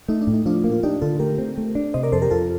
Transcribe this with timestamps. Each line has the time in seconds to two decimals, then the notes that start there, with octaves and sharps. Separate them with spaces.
0.08 A3 D#4
0.21 D4
0.27 A2
0.34 D#4
0.46 F3 D4 F4
0.64 A#3
0.72 F4
0.83 D4 D#4 G4
1.02 D3 F4 A4
1.19 A3 G4 A#4
1.38 C4
1.58 A3
1.75 D4
1.94 C3 C5 D#5
2.03 A#4 D5
2.12 F2 A4 C5
2.22 G4 A#4
2.30 F2 F4 A4